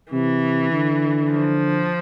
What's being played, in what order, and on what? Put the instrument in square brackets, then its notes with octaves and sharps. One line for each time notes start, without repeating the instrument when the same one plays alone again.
[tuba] C3 [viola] E3
[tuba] D3
[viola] F3